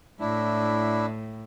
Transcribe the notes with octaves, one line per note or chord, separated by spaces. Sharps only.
A2 D4 E4